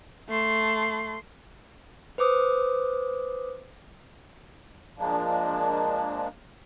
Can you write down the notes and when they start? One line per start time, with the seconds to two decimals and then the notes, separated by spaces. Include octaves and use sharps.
0.29 A3 C6
2.18 B4 C5 D6 D#6
4.98 F3 G#3 A#3 D4